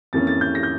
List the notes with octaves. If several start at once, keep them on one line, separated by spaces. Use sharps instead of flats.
F2 E3 A#3 C#4 A6
A6
G6
A#6
G6